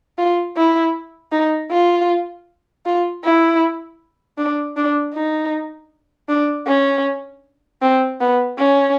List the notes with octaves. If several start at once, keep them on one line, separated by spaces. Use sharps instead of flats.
F4
E4
D#4
F4
F4
E4
D4
D4
D#4
D4
C#4
C4
B3
C#4